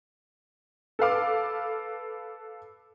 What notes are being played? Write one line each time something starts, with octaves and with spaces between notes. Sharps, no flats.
A4 B4 F5 D6